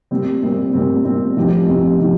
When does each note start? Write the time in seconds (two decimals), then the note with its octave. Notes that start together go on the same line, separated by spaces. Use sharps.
0.11 A#2 G3 C4
0.42 A#2 G3 C4
0.73 A#2 G3 C4
1.04 A#2 G3 C4
1.36 A2 F3 C4 D#4 G4
1.67 A2 F3 C4 D#4 G4
1.99 A2 F3 C4 D#4 G4